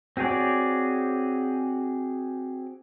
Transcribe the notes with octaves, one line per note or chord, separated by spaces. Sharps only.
C4 F#4 G#4 C#5 D5